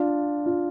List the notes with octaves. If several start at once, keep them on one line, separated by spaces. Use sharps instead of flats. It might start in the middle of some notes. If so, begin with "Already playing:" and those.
Already playing: D4 F4
F4